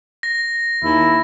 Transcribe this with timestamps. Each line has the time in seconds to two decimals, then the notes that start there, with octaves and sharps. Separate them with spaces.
0.23 A#6
0.84 D#2 E4